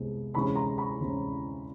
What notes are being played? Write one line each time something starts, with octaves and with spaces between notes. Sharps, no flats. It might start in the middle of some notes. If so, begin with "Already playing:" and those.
Already playing: C2 C3 G#3 B3
D2 C3 E3 G#3 C#4 B5 C#6
A#5 C6
B5 C#6
D2 C3 E3 G#3 C#4